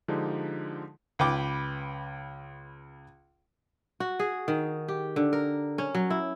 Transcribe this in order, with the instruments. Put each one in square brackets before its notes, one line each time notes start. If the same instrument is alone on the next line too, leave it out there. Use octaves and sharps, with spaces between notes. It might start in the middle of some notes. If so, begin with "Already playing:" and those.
[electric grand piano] D3 F3 G#3 D4 D#4 G4
[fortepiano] C#2 B4 G5 D6
[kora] F#4
G#4
D#3
G4
D3
A#4
C#4
F#3
E4